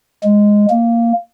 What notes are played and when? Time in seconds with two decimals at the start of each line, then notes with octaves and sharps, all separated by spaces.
0.23 G#3
0.70 A#3